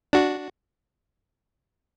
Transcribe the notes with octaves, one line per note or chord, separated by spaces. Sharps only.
D4 F#4